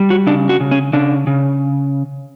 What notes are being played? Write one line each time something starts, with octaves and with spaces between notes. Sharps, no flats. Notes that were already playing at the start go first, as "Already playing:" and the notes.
Already playing: G3
F#4
C#3 D4
F#4
C#3
C#4
C#3 D4
C#3